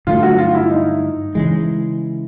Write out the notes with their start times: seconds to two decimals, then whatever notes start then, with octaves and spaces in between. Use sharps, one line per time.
0.07 G2 D3 F#3 A3 F4
0.23 F#4
0.38 F4
0.55 E4
0.70 D#4
1.35 C#3 E3 G#3